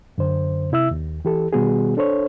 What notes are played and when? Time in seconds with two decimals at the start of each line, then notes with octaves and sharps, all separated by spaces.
0.18 F#2 D3 C5
0.72 C3 E4 E5 E6
0.91 D#2
1.25 E3 G4 A4
1.53 B2 D#3 G3 B3 F#4 G#4
1.97 D4 A4 C5 C#5